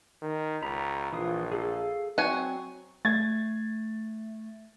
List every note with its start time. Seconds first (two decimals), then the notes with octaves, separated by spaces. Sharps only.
0.22 D#3
0.63 C#2 A#5 B5
1.13 A#1 E3 F4 D#6
1.52 G#4 A4 F5
2.18 F#3 C4 F#5 G#5 C#6
3.05 A3 G#6 A6